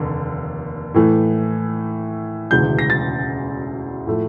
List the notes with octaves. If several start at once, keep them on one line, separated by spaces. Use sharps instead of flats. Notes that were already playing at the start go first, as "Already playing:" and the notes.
Already playing: F1 D#2 D3
A2 E3 A3
E1 D2 C#3 E3 G#3 G6
A#6
A6
A2 F3 A3